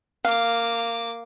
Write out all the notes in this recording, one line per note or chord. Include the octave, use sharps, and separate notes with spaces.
A#3 F5 D6